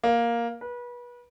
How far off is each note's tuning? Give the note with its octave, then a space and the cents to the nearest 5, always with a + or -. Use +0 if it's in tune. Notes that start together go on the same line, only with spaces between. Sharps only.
A#3 +5
B4 -30